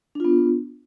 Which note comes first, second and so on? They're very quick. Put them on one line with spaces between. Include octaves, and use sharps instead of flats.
D4 F4 B3